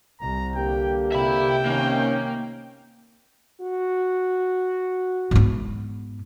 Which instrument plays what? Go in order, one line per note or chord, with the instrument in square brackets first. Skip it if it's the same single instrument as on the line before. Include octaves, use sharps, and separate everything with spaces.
[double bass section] C2 [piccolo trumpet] A#5
[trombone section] D3 A#3 G4 [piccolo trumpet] G5
[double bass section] C3 [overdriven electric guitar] E5 B5 [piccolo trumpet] G5
[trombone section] D#3 C#4 [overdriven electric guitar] A#3
[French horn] F#4
[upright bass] G#2 B3